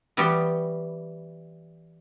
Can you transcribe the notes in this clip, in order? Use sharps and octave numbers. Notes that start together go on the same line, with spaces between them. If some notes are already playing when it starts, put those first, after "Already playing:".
E3 G3 B3 F#4 G4